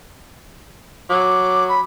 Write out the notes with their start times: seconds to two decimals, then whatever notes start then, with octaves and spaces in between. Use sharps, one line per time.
1.10 F#3 D6
1.69 B5